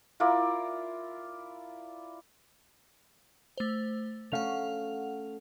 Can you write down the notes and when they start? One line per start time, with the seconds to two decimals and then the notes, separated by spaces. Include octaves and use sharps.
0.20 E4 F4 A#4 D5
3.58 A3 C5
4.32 A3 C#4 F5 F#5 F7